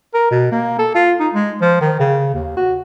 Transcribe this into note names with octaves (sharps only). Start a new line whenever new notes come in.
A#4
B2
A#3
A4
F4
D#4
G#3
F3
D#3
C#3
D#2
F#4